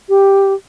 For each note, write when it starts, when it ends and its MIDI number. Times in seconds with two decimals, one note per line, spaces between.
0.09 0.54 67